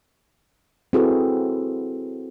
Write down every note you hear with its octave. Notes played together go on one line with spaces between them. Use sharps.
C4 E4 F#4 G#4 A4 B4